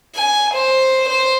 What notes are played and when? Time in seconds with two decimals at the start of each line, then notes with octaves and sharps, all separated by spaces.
0.15 G#5
0.54 C5
1.09 C5